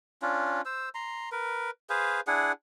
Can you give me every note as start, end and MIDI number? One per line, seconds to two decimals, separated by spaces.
0.22 0.61 61
0.22 0.61 62
0.22 0.61 65
0.65 0.89 72
0.65 0.89 88
0.95 1.29 82
0.95 1.29 84
1.32 1.71 70
1.32 1.71 71
1.90 2.21 68
1.90 2.21 71
1.90 2.21 72
1.90 2.21 77
2.27 2.52 62
2.27 2.52 64
2.27 2.52 68
2.27 2.52 78